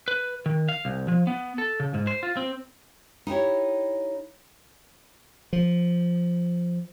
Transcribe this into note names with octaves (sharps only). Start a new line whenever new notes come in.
B4
D#3
F5
C2
F3
B3
A4
C#3
G#2
C5
F4
C4
D#4 E4 G4 C#5
F3